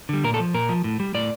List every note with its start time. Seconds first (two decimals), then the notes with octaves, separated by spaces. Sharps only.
0.09 D3 G3
0.24 A#2 A#4
0.34 A4
0.39 F3
0.54 A#2 A#4
0.69 F3
0.84 A2
1.00 G3
1.14 A2 D5